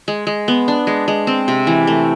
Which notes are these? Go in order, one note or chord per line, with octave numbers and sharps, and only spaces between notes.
G#3
G#3
B3
D4
G#3
G#3
C4
C3
E3
A3